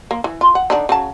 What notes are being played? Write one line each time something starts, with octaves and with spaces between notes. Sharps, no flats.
A#3
E3
F4
F#5
D3 D4 D#4
C#3 F#3 A5